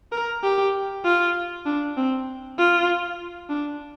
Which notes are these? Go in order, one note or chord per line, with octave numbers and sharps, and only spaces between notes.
A#4
G4
F4
D4
C4
F4
D4